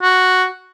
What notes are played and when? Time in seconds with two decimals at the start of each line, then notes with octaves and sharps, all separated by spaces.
0.03 F#4